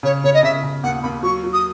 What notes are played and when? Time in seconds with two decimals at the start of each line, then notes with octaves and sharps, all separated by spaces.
0.03 C#3 C#5
0.24 C#3 C#5
0.34 D#5
0.43 C#3 E5
0.64 C#3
0.83 D#2 F#5
1.03 D#2 B5
1.23 F#3 C#6
1.44 F#3
1.53 D#6